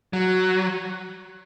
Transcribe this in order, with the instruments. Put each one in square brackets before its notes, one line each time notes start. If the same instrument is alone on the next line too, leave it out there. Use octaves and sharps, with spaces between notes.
[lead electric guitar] F#3